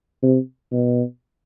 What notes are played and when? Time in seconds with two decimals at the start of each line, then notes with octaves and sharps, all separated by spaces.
0.22 C3
0.72 B2